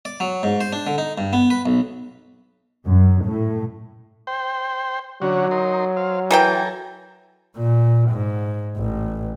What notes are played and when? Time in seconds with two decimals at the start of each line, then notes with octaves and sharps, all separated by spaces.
0.05 D5
0.20 F#3
0.43 G#2
0.61 C5
0.73 D4
0.87 D3
0.98 D#4
1.18 G2
1.33 B3
1.50 B4
1.66 B1
2.86 F#2
3.24 A2
4.27 C5 G5
5.22 D3 F#3 C#4 F#4
5.51 D#4 A#4 C6
5.97 C5 F5
6.31 E3 A4 A#4 G5 G#5 A#5
7.58 A#2
8.10 G#2
8.77 A1